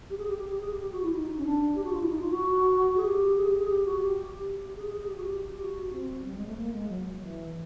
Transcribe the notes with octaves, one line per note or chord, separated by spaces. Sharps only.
G4
G#4
G4
G4
G4
G#4
G4
G4
F#4
E4
D#4
D#4
C#4
D4
G4
F#4
F4
E4
D#4
F4
F#4
G#4
G4
G#4
G4
G#4
G4
F#4
G4
G4
G#4
G#4
G#4
G4
F#4
G4
F#4
C4
G3
G#3
A3
A#3
G#3
F#3
E3